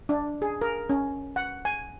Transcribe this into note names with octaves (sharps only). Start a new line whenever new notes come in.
D4
G#4
A#4
C#4
F#5
G#5